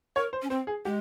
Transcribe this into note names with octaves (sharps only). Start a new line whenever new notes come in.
A#4 C#5
C5
C#4
C4 C5
G#4
G#3 G4